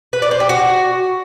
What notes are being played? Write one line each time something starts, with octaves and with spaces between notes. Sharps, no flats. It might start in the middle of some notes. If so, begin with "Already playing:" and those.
B4
D5
C5
G4
F#4